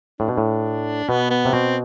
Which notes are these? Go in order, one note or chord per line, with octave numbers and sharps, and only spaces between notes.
A2 D4
B2
A2
B2 B3
B3
C3
B2 C4